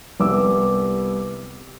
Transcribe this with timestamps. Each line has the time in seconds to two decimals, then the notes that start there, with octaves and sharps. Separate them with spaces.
0.20 C2 B3 G4 D6 E6